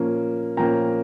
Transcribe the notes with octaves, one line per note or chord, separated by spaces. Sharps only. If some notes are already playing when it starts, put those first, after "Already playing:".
Already playing: A#2 F3 A#3 C#4
A#2 F3 A#3 C#4 G5 A#5